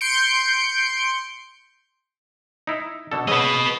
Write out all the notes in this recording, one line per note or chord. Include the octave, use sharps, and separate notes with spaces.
C6 G6 C#7 D7
D#4 E4
B2 D3 A4
C#3 B3 B4 D#5